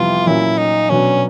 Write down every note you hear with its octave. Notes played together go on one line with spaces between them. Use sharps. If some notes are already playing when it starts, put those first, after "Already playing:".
Already playing: F2 C3 E3 G3 B3 F4
A#2 F#3 A#3 C#4 E4
D#4
B2 F#3 B3 C#4 D4